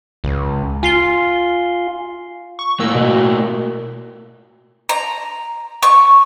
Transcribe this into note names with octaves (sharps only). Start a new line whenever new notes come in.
C#2
F4 G#5 C7 G7
C#6
A2 A#3 E6
B2
A#5
C#6